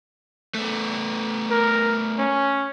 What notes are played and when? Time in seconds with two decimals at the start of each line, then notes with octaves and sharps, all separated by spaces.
0.55 A3 B3
1.51 A#4
2.19 C#4